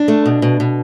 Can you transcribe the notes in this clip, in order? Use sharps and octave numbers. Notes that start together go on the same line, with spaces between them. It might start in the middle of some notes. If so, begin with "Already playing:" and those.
Already playing: D4
A3
B2
B2
B2